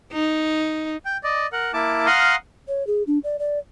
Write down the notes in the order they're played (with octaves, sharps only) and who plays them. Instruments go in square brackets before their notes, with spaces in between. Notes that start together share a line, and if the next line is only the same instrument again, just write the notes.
[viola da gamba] D#4
[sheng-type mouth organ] G5
D5 D#5
A#4 F#5
A#3 E4 A5 D6
F5 F#5 A#5 C6 D#6 F6
[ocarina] C#5
G#4
D4
D5
D5